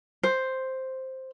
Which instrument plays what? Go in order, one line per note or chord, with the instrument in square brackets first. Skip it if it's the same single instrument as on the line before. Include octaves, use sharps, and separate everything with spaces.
[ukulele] C5